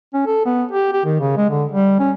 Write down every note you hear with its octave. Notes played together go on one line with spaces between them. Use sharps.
C#4
A4
B3
G4
G4
D#3
C#3
G#3
D3
G3
C#4